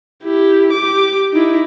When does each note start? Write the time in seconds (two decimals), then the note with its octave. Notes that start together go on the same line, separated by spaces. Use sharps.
0.24 E4 G4
0.73 G4 D6
1.33 D#4 E4